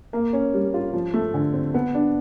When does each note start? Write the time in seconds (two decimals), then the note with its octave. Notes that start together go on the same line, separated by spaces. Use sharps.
0.13 A#3
0.33 C#4
0.54 G3
0.74 F4
0.93 F3
1.14 A3
1.34 D3
1.54 C4
1.74 B3
1.95 D4